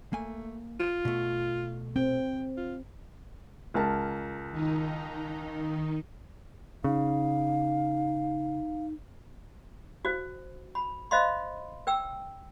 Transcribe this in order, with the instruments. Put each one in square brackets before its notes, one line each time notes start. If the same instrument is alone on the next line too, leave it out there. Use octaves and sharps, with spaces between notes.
[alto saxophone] A3 [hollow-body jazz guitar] A#3 G#5
[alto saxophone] F4
[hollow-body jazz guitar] B2 A3
[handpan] C4 [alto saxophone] G5
[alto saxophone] F4
[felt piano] C#2 A#4 A5
[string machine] D#3 D#4
[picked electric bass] C#3 [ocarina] D#4 [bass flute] F5
[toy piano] F#4 C5
B5
C5 D#5 F5 B5 C6
B4 G5 E6